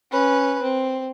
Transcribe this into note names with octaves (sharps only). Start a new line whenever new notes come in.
C#4 B4
C4